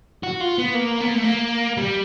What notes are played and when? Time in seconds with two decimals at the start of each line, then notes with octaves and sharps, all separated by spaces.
0.23 F#4
0.40 F4
0.58 B3
0.74 A#3
1.00 B3
1.08 A#3
1.15 A3
1.24 A#3
1.77 G3